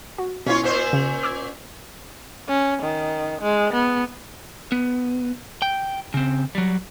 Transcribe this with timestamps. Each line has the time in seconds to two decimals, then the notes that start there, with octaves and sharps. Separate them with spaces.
0.18 F#4
0.46 B2 C#4 E4 F4 C#5
0.63 A#2 C#4 C5
0.93 C#3
1.23 D6 E6 G#6
2.49 C#4
2.83 D#3
3.41 G#3
3.73 B3
4.72 B3
5.62 G5
6.14 C#3 C4
6.55 F#3 G3